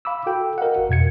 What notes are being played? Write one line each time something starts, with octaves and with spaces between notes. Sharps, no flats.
F5 B5 D6 E6
F#4 A4 G5
A#4 D#5 F5 F#5
G1 F#4
F2 B2 G#6 C#7